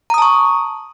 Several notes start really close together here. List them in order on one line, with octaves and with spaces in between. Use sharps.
A#5 D#6 A5 C#6